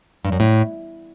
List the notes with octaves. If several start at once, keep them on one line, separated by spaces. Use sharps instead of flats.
G2
F#2
A2